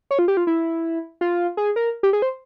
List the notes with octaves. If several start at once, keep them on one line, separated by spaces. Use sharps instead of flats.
C#5
F4
G4
F4
E4
F4
G#4
A#4
G4
G#4
C5